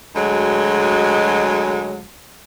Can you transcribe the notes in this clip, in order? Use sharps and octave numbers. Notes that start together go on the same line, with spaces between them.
D2 F#3 G#3